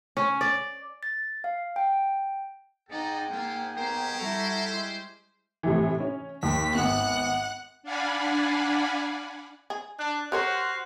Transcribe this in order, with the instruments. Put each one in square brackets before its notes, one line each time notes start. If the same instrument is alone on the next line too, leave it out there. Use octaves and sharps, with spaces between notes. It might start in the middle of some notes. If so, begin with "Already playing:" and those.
[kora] C#4
D5
[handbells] A6
F5
G5
[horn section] G#2 G#4 G5 [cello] D#4 [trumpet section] A4 D5 D#5
[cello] A#3 [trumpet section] E4 F4
[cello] B3 A#4 [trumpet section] C#4 G4 C5
[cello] G3 E4 [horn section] F#4 A4 A#5
[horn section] G#3 E4 C6
[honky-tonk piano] A2 C3 E3
C#4
[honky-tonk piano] D#2 [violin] B6
[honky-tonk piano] G#1 B3 [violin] F#5 F#6
[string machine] D4 D5 F5 F#5 G#5 B5
[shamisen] G#4
[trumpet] D4 [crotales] F#6
[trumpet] F#4 [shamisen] G4 A#4 C#5 [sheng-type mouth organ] C5 C6 F6 [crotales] F#6